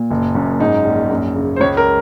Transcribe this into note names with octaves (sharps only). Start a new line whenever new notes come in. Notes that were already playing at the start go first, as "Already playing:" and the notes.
Already playing: A#2
F#1
F#2
G#2 D#4
A#1
F#2
C#3
C5
C#2 C#5
A#4